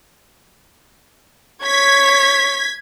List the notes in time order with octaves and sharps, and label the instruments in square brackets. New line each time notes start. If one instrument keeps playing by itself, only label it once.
[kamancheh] C#5 [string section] G#6 B6